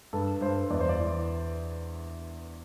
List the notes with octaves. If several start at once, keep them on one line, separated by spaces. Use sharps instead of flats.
G2 A4
G2 C5
E2 D5
C5
D5
E3